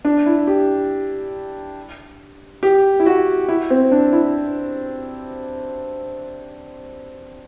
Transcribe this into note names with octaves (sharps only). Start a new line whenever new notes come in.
D4
E4
G4
G4
E4
F#4
E4
C4
D4
E4